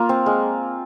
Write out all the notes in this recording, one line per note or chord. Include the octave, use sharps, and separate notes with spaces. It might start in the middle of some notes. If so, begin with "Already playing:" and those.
Already playing: A#3 F4
C4
G#3